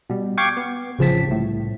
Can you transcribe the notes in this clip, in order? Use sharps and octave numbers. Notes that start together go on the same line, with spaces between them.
B2 G3
F5 G5 C#6 D6 G#6 C7
B3
A1 C#3 F3 C4 A5 B6
C2 A2